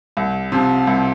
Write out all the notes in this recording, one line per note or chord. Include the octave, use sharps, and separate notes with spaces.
C2
C3 F3
C2